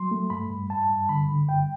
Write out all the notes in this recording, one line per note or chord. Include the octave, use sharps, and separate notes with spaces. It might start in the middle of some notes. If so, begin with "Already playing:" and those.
Already playing: F#3 C6
A3
G2 B5
G2
G2 A5
G2
D3 B5
D3
G2 G5